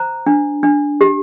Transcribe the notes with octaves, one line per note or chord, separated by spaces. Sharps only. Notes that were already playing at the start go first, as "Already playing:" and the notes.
Already playing: C5 A#5
D4
D4
G4